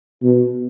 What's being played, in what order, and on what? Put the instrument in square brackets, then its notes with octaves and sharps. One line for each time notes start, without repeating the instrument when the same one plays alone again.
[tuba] B2